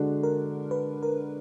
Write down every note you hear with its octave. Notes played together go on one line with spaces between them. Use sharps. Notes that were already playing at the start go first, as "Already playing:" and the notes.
Already playing: D3 G#3 D4 F#4
A#4
B4
A#4